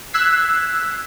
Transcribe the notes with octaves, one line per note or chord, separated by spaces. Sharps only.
E6 F#6 G#6 B6 C7